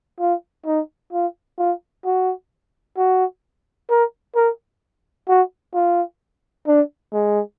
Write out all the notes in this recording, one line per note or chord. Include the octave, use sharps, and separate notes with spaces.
F4
D#4
F4
F4
F#4
F#4
A#4
A#4
F#4
F4
D4
G#3